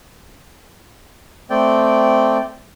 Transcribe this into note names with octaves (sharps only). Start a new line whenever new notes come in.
A3 C4 D5 G5